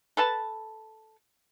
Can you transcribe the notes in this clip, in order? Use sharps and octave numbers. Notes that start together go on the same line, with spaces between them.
A4 B4 A5